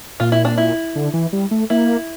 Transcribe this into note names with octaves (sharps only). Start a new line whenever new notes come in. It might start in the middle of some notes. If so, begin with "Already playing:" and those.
A#2 F4
E4
D4
E4
D3
E3
G3
A3
A#3 E4